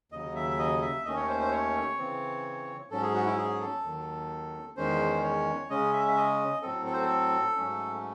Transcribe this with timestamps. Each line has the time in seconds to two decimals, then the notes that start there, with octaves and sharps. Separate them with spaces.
0.12 D#2 C#3 F#3 D#5
0.35 E5
0.51 E5
0.59 D#5
0.82 E5
1.05 D#2 D#3 A3 C#4 D#5
1.16 C#5
1.28 C5
1.40 C5
1.51 C#5
1.98 C#3 E3 C4
2.91 G#2 F#3 C#4 A4
3.02 G#4
3.14 F#4
3.26 E4
3.37 G#4
3.60 A4
3.84 D#2 D#3 F#3
4.76 E2 D#3 G#3 C#4 C5
5.24 C#5
5.70 C#3 G#3 C#4 D#5
5.93 E5
6.08 E5
6.17 D#5
6.62 A2 F#3 C4 A4
6.86 A4
6.93 C5
7.01 A4
7.56 G#2 F#3 A3 C#4